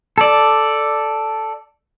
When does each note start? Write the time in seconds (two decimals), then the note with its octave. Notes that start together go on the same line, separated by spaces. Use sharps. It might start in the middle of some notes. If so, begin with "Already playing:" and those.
0.18 A4 D5